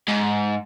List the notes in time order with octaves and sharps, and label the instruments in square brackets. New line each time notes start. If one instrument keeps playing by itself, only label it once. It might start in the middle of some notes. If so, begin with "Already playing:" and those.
[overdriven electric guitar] G#2